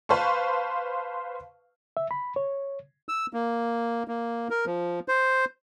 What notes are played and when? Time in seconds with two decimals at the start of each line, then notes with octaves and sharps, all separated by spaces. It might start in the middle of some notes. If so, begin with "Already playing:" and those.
0.09 B4 C5 F5 A5 C#6
1.97 E5
2.11 B5
2.36 C#5
3.08 E6
3.33 A#3
4.08 A#3
4.50 A#4
4.66 F3
5.08 C5